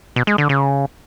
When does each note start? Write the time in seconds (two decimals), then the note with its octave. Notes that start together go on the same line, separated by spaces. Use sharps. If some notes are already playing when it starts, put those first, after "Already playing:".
0.16 B2
0.27 G#3
0.38 D3
0.49 C#3